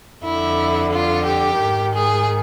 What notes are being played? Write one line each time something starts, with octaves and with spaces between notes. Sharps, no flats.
F2 D3 E4
F4
G4
G#2 D#3
G#4